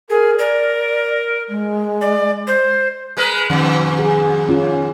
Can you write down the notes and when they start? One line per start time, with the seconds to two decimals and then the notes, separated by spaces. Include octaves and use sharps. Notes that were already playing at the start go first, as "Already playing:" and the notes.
0.10 G#4 A#4
0.39 A#4 D5
1.49 G#3
2.01 D5
2.47 C5
3.17 G#3 A#4 B4
3.50 F2 G#2 B2 D#3
3.99 G#4
4.49 C#4 F4 G#4